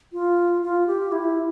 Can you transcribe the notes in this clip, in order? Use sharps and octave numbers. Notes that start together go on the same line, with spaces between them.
F4
F4
G4
E4